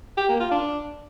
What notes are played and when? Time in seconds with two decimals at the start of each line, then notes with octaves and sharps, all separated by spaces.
0.18 G4
0.29 A#3
0.40 F4
0.51 D4